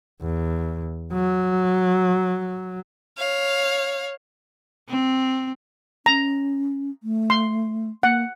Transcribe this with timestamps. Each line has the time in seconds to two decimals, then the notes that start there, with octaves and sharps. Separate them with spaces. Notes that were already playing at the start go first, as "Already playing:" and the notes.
0.22 E2
1.13 F#3
3.18 C#5 F5
4.89 C4
6.06 C#4 A#5
7.03 A3
7.30 C6
8.03 A#3 F#5